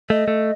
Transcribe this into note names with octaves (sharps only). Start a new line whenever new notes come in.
A3 D#5
A3